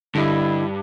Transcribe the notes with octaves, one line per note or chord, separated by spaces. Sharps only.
G2 D3 E4 D#5